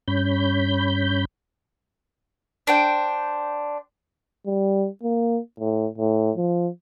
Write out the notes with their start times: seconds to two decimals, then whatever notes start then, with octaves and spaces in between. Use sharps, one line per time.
0.08 G2 C#4 B5 G6
2.67 D4 C5 G5
4.46 G3
5.03 A#3
5.60 A2
5.98 A2
6.36 F3